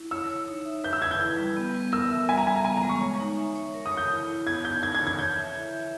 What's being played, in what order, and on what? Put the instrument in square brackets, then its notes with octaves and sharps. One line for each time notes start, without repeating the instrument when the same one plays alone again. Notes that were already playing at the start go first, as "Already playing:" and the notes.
Already playing: [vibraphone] E4
[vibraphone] C#5 [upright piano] E6
[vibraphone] C#5
D#4
E5
[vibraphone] B4 [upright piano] G6
[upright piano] E6
[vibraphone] B4 [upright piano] G#6
[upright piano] G6
[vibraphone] E4
G3
B3
B3
[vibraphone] A#4 [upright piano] E6
[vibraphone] E5
[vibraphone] G3 [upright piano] G#5
[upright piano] A#5
[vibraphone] G3 [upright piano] G#5
[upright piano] A#5
[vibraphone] B3 [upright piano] G#5
[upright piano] A#5
[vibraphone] G#3
[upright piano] C#6
[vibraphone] C#5
D#4
E5
C#5
A#4
[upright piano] D#6
[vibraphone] C#5
[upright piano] G6
[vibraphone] E4
E4
[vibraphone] B3 [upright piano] G#6
[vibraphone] D#4 [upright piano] G6
[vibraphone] A#4 [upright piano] G#6
[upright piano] G#6
[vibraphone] C#5
[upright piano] G#6
[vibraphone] C#5 [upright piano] G6
[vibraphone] E5
E4
E5